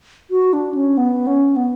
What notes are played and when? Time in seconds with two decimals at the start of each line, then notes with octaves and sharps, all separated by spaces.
0.30 F#4
0.53 D4
0.74 C#4
0.97 B3
1.27 C#4
1.56 B3